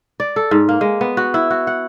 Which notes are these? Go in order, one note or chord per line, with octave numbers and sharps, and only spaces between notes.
D5
A4
G#2
A#3
G#3
B3
F#4
E4
F#4
F#5